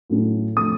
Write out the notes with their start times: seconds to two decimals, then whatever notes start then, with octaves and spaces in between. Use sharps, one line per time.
0.10 A2 F#3 A3 C#4
0.57 C3 F3 A3 D4 D#6